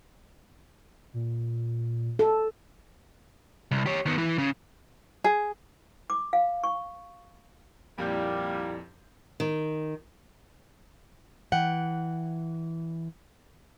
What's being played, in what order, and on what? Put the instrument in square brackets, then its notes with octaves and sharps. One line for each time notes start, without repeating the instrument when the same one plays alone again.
[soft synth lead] A#2
[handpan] A4
[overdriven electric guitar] C2
G4 C#5
D#3 B3
E3
C#3
[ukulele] G#4
[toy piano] D6
F5
C#6
[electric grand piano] F2 A#2 G6 [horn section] G3 A#3 [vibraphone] E4 G4 D5
[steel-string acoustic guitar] D#3
[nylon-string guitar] E3 F#5 G5